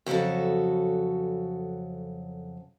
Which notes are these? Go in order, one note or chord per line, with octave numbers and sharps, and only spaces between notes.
F2 C#3 F#3 F#4 A4